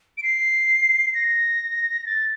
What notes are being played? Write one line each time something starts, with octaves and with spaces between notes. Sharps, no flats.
D7
C7
A#6
A6